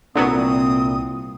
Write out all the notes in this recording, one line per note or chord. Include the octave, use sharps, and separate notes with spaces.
C2 A#2 D3 F#3 B3 C4 D#6